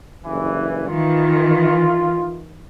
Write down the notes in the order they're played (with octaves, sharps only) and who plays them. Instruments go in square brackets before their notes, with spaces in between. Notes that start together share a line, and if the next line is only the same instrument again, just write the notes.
[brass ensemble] F#1 G2 E3
[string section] D#3 E3 [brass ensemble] F4